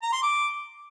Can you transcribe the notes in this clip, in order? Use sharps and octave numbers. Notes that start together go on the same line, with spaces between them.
A#5
C6
D6